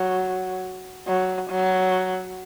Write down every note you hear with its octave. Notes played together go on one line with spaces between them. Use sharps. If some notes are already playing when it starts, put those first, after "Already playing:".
Already playing: F#3
F#3
F#3